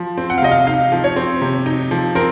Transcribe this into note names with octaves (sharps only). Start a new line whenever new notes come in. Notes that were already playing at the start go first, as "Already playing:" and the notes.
Already playing: F3
C4
F#5
F5
C3 D#5
F5
D#4 F5
F3
C#5
C4
C3
D#4
F3
C4 A#4